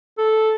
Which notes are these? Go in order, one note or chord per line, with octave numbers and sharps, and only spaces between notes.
A4